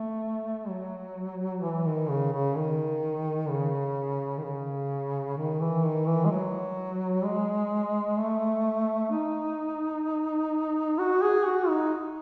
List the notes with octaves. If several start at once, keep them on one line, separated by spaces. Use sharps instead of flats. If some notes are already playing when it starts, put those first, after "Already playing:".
Already playing: A3
F#3
E3
D#3
C#3
C#3
D#3
C#3
D#3
C#3
D#3
E3
D#3
E3
G#3
F#3
G#3
A3
D#4
F#4
G#4
F#4
D#4